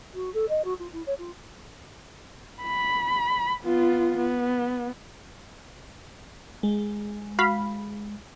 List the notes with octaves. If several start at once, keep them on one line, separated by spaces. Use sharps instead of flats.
F#4
A4
D#5
F#4
F4
E4
C#5
F4
B5
B3 F4
B3
G#3
F#4 F5 B5